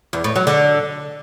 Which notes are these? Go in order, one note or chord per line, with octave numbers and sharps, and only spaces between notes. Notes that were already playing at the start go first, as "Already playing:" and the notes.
E2
A2
F#3
D3